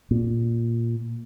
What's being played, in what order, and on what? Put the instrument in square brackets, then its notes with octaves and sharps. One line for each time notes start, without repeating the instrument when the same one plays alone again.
[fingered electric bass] A#2